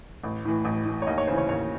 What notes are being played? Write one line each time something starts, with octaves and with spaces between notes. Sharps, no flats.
A1
A2 E3
A1
A2 E3
C#5
D#2 D#5
C#5
C#3 E3 C5
C#5
D#2 C#5